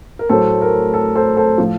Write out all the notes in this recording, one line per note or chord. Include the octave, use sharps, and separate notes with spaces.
A#4
A2 F#3 A3 A4 C5
A#4
A4
A4 C5
A4 C5
A2 F3 A3